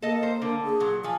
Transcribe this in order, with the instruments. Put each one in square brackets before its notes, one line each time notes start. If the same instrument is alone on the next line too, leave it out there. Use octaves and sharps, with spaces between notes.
[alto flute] A#3 [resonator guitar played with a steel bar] A4 D#5
[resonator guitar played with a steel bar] C5
D3
[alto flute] G#4
[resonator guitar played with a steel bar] A#2 F#3
[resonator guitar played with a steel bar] F3 [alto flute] G#5